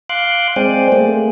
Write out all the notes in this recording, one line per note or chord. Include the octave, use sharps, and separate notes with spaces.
F5 C6 D6 F#6
G#3 C4 C5 D5 G5 G#5
A3 A#3 G#4